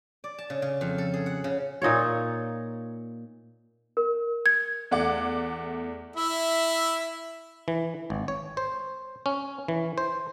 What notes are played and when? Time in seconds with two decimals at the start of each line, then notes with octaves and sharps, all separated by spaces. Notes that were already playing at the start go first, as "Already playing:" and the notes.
0.24 D5
0.38 A5
0.50 C#3
0.62 C#3
0.81 F2
0.98 A4
1.14 G#4
1.26 F#5
1.44 C#3
1.82 A#2 D#4 F4 C#5
3.97 A#4
4.46 G#6
4.91 E2 A3 D5 F#5 D6
6.16 E4 E5
7.68 E3
8.10 G#1
8.28 C#5
8.57 C5
9.26 C#4
9.68 E3
9.98 C5